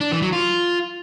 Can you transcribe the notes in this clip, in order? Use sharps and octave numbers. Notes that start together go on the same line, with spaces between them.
D4
E3
F#3
F4